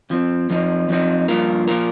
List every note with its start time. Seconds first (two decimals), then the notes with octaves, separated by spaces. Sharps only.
0.10 F2 F3 C4
0.50 F2 F3 C4 D#4
0.89 F2 F3 C4 D#4
1.28 G2 F3 A#3 F4 A#4
1.68 F3 A#3 F4 A#4